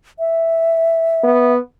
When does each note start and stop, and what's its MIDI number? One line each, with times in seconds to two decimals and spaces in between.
0.19 1.53 76
1.24 1.59 59